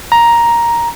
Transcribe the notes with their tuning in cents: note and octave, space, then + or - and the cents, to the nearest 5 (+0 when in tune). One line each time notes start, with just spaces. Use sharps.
A#5 +10